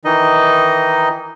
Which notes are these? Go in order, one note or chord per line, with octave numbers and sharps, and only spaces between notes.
D#3 E3 D#4 D#5